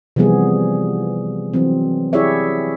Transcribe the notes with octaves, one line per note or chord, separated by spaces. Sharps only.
C3 E3 F3 G3 B3 G#4
E3 F#3 C4
E4 G4 G#4 C#5 D5 E5